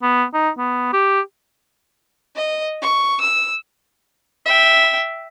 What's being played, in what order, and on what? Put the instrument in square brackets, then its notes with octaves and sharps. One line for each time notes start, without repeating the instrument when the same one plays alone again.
[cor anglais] B3
D#4
B3
G4
[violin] D#5
C#6
E6
[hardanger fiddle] E5 G5